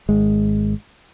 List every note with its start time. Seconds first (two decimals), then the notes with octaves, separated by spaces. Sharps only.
0.09 G#1 G#3